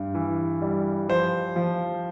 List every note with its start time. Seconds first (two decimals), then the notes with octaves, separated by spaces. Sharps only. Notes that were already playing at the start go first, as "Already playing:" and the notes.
Already playing: G2 G3
0.15 E3
0.62 G3
1.09 F3 C5
1.56 F3